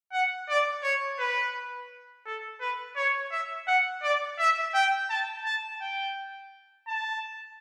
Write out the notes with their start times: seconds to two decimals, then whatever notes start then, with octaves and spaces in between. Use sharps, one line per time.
0.13 F#5
0.49 D5
0.83 C#5
1.19 B4
2.26 A4
2.61 B4
2.96 C#5
3.32 E5
3.67 F#5
4.03 D5
4.39 E5
4.74 G5
5.10 A5
5.45 A5
5.81 G5
6.88 A5